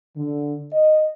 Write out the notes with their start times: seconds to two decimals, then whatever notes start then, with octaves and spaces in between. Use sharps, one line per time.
0.17 D3
0.73 D#5